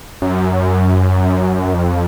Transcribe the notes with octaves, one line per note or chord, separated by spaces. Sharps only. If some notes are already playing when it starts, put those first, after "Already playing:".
F#2
F2